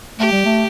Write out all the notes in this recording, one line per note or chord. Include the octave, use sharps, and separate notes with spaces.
A3 G4
G3
A3